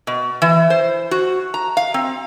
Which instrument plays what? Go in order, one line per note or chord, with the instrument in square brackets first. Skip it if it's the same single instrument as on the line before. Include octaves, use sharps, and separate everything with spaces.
[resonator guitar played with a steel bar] B2
E3
C5
F#4
A#5
F5
C4